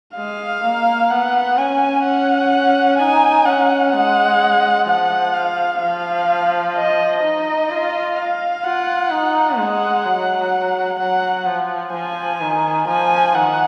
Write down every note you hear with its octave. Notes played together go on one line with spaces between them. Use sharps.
G#3 F5
A#3
B3 F#5
C#4 G#5
F#5
D#4 G#5
C#4 F#5
G#3 F#5
F3 F#5
F5
F3 F5
D#5
D#4 D#5
F4
F5
F4 F#5
D#4
G#3 F#5
F#3
F#3 F#5
F3
F3 G#5
D#3
F3 G#5
D#3 F#5